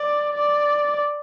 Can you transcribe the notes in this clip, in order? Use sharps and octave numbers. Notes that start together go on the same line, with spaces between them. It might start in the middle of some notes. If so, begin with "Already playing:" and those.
Already playing: D5
D5